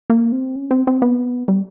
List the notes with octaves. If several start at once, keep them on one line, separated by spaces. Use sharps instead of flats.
A#3
C4
C#4
C4
C4
B3
G3